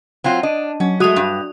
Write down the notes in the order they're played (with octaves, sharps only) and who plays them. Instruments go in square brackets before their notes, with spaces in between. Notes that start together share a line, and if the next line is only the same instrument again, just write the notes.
[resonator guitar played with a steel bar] F#3 C4 F4
[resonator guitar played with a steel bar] D4 [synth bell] D#5
[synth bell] F#3 [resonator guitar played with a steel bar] C#4
[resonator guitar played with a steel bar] G#3 A3 [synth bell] F#4 D#6 F7
[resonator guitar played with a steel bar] G2